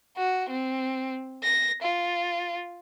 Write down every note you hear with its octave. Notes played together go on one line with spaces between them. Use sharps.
F#4
C4
A#6
F4